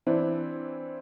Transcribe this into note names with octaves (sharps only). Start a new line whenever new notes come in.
E3 C4 D4 E4